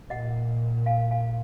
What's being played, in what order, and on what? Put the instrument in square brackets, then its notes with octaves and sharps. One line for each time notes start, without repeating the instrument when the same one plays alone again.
[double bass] A#2 [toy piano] D#5 F#5
[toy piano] F5 G#5
F5 G#5